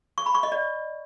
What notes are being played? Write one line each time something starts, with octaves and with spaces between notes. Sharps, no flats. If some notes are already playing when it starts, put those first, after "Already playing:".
C#6
B5
C#6
D#5
D5